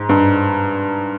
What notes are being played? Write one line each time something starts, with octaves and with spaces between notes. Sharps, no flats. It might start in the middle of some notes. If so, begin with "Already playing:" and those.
Already playing: G#2
G2